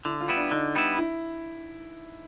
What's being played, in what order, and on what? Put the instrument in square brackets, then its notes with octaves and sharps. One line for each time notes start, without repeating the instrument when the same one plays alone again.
[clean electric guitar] D3 [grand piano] E4
[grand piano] F4
[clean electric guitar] G3 B3 E4
[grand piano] D4
[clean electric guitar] D3 [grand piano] D#4
[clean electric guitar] G3 B3 E4
[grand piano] E4